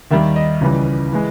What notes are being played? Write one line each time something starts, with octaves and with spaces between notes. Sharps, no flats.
D#2 D#3 G3 E5
D#5
C#2 C#3 E3 G3
E3 G#3